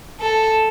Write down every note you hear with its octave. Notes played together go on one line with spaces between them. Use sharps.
A4